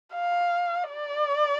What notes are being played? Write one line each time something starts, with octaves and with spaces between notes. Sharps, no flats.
F5
D5